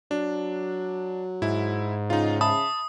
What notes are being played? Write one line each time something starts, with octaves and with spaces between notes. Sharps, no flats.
F#3 D4
G#2 E4
C#3 D#4 F4
E5 A5 B5 D#6